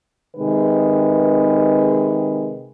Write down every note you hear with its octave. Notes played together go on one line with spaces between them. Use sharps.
C3 D#3 G#3 B4